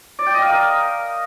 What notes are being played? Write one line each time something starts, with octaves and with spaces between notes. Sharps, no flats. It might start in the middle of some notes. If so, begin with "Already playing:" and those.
D5
G5
D#5
F5
A#4